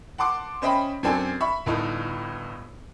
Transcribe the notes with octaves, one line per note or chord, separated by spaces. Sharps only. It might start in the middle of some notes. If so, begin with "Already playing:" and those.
F#5 A5 C6 D6
C#4 C5 D#5 E5 G5 B5
F#2 C4 D4 A4 G#5
E5 B5 C#6
G1 A2 D#4 A4